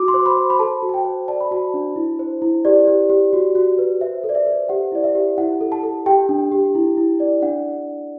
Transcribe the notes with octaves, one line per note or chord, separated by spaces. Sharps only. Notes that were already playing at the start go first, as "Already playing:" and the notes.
Already playing: F#4 D6
C6
C5
B5
C5
B5
A4 A5
F#4
A5
G5
C5
D5 A5
B5
F#4 A5
D4
E4
C5
E4
G4 D5
G4
G4
F#4
F#4
B4
C5 E5
A4
D5
E5
C5
G4 F#5
E4 D5
E5
G4
E4 F#5
A4
A5
A4
G4 G5
D4
G4
E4
E4
D5
D4 F#5